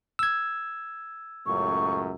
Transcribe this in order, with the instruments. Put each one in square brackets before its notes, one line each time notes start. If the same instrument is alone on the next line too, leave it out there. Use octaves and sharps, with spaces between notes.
[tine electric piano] E6 G#6
[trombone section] C#2 F#2 A2 [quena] C#6